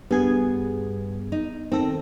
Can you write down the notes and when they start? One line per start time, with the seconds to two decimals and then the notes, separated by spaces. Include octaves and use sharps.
0.11 G2 B3 G#4 G#6
1.32 D#4
1.72 D#3 C4 A4 A#6